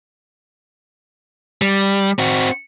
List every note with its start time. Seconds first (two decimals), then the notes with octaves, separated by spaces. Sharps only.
1.62 G3
2.19 C4 F#4